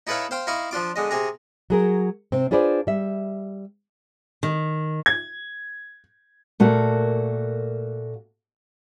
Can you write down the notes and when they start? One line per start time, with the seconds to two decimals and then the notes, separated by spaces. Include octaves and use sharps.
0.07 D#4 E4 A4 B4 C#5 F5
0.31 C5 F5 G5 C6
0.47 D#4 E4 F5 C6 C#6
0.71 F3 D4 F4 D6
0.96 D3 G#3 D#5
1.11 C3 G#4 A#5
1.70 F#3 G#4 A#4
2.32 C3 C4
2.51 D4 F4 G#4 B4 C5 D5
2.87 G3 E5
4.43 D#3
5.06 G#6
6.60 A#2 A3 A#3 F#4